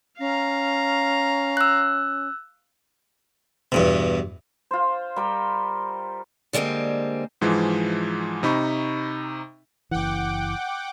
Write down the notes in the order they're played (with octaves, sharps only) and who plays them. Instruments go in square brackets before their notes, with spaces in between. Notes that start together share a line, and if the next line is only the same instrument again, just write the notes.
[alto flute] C#4 [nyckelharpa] F5 A#5
[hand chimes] E6 F#6
[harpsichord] E2 G2 B2
[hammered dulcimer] F4 C5
G3 A#4 G5
[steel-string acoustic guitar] D3 G3 G#3 A#3 C4
[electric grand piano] G#2 E3 F3 G#3
C3 D#4 B5 C#6
[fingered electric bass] F#1 E3 [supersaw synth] F#5 G5 D6